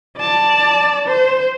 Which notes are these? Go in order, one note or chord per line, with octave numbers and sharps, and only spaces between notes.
D5 A5
C5